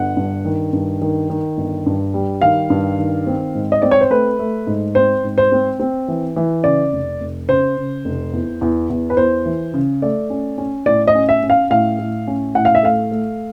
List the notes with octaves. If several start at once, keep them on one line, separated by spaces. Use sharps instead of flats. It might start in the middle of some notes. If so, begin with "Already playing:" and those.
Already playing: G1 F#5
G2
D#3
G2
D#3
D#3
G1
G2
G3
D#3 F5
G2
D#3
C4
G#2
D#5
C4 D5
C#5
C5
A3 B4
A3
G#2
C4 C5
G#2
C5
C4
C4
E3
E3
C#3 D5
F1
F1
C#3 C5
C#3
F1
E2
E2
E2
B4
E2 C5
E3
C#3
A3 D5
C#4
C#4
A2 D5
D#5
C#4
E5
C#4
F5
A2 F5
A2
C#4
A2 F#5
F5
E5
A3 F5
A3